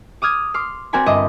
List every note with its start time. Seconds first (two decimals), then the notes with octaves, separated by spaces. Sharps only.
0.22 D6 D#6 F6 G#6
0.54 C6 D6 F6
0.93 C4 F#4 A#4 D5 G#5 B5
1.06 G1 D#5 E5 D6